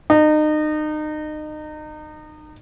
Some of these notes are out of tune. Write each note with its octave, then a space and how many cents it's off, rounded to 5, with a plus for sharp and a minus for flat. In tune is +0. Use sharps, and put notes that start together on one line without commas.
D#4 -30